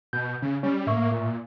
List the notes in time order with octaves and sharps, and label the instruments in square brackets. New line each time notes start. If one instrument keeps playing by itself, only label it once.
[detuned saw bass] B2 [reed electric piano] G6
[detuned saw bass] C#3 [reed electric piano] C#4
[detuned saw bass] G3 [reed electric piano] C#4
[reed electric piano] A2 E5 C#6 [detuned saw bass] A#3
[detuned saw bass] A#2